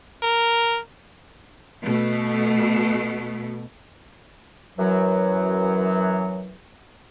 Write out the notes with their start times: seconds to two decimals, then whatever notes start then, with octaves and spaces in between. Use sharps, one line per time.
0.23 A#4
1.84 B2 A3
4.78 F#2 E3 F#3